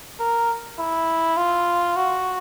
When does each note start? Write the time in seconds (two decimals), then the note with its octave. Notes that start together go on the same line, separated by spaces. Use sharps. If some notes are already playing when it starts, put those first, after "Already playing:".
0.19 A#4
0.78 E4
1.37 F4
1.96 F#4